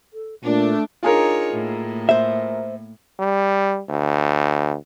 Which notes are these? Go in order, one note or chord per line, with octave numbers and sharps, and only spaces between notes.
A4
A#2 A3 D4
D4 D#4 F4 G#4 A#4 C#5
A2 A#3
C5 E5
G3
D2